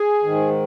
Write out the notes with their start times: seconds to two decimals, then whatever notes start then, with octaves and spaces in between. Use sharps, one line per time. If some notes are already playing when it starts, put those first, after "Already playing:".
Already playing: G#4
0.23 G#2 D#3